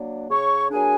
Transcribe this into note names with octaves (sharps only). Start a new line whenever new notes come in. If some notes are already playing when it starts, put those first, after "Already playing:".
Already playing: F#3 A#3 D4
C#3 C#5 C#6
F#3 A#3 D4 G#4 G#5